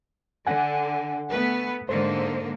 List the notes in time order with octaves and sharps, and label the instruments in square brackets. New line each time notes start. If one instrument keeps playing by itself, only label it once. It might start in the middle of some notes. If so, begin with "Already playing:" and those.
[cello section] D3 [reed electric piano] F#5 G#5
[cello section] A3 B3 B4
[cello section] G#2 D3 A#3 [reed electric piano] C5